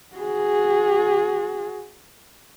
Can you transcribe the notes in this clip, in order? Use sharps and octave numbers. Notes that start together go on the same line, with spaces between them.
F#4 G#4